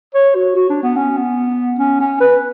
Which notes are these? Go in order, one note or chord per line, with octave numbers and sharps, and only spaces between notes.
C#5
F#4
F#4
D4
B3
C#4
B3
C#4
C#4
B4